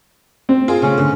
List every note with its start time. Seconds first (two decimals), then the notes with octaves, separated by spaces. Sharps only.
0.49 C4
0.68 F4 G#4
0.82 C#3 A3 C#4
0.98 D3